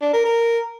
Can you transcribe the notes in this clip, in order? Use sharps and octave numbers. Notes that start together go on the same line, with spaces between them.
D4
A#4
A#4